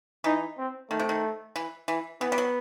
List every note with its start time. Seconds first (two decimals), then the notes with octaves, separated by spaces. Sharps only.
0.24 E3 D#4
0.58 C4
0.91 D#3 A3
0.99 C3
1.09 D#3
1.56 E3
1.88 E3
2.21 E3 B3
2.32 G3
2.38 F#3